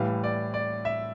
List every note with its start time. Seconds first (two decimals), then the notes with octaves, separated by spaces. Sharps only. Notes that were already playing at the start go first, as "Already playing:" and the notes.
Already playing: A2 E3 G3 F5
0.24 D5
0.54 D5
0.85 E5